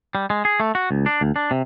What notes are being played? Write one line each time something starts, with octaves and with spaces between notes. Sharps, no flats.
G3
G#3
G#4
A3
F#4
C#2
D4
D2
D4
C3